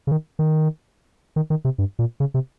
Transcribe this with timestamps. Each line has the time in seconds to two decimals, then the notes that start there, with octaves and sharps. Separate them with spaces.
0.07 C#3
0.11 D#3
0.39 D#3
1.36 D#3
1.50 D#3
1.65 C3
1.78 G2
1.99 A#2
2.20 C#3
2.34 C3